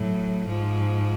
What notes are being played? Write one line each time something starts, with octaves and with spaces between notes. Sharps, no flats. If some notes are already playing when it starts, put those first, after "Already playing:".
Already playing: A2 F#3
G#2 F3